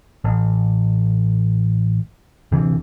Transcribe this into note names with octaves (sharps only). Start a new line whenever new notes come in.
A1
D2 C3 E3